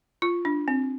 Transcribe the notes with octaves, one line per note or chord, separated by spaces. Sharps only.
F4
D4
C4